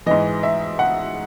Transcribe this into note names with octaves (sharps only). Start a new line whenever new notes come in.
G#2 E3 D#5
E5
F#5